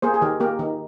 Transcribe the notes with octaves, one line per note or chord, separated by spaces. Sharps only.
A#3 G#4 C5
G#4
D#3 G4 A#4
A#3 G4 A#4
D#3 D#4